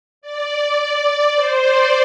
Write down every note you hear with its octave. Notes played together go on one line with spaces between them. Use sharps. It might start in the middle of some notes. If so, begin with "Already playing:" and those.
D5
D5
C5
D5